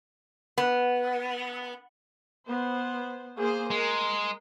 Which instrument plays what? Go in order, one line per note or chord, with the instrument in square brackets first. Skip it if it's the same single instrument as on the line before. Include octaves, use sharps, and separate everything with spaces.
[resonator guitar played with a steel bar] B3
[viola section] B3 C5
A#3 G#4 C5
[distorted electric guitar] G#3 [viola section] A#4